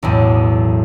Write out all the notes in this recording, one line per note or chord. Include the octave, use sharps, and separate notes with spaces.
B1 E2 A2 D#7